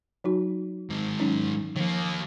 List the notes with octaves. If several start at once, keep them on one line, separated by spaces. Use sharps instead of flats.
F#3 D#4 F#4
G#2 D#3
F#3 C#4 D#4
D#3 F3 A#3